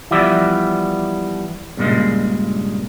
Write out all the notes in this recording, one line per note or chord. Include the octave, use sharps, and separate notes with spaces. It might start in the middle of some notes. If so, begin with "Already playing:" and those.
E3 F3 G3 B3 D5 E5
G2 A#2 C#3 G#3